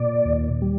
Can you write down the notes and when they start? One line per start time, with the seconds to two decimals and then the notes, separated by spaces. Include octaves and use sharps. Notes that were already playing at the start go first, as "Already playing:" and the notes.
Already playing: A#2 D5
0.25 D#2
0.62 G3